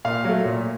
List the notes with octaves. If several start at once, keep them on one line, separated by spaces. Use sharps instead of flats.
A#2 F5
F#3 A3
A#2